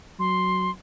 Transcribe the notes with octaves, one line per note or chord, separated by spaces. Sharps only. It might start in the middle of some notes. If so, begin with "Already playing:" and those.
F#3 C6